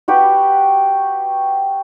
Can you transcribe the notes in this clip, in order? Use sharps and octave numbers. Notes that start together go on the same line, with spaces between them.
F#4 G4 B4 G5